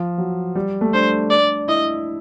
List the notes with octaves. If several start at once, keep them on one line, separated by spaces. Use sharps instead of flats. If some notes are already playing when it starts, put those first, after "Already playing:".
Already playing: F3
F#3
G3
A3
D4 C5
D5
E4 D#5